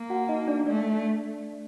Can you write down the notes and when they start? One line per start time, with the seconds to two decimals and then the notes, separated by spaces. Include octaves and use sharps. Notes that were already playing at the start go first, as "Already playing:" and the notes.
Already playing: A#3
0.10 F#4 F#5
0.29 D#4 D#5
0.48 D4 D5
0.66 A3 D4 D5